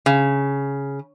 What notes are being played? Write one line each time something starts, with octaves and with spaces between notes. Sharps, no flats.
C#3